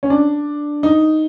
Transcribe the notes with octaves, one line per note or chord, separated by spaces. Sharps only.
C#4
D4
D#4